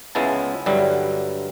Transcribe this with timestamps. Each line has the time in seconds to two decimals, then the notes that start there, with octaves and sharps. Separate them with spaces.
0.15 C#2 C#3 G#3 B3 E4 A5
0.66 G2 D3 F#3 G3 E4